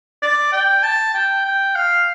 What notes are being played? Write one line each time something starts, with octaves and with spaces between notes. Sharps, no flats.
D5
G5
A5
G5
G5
F5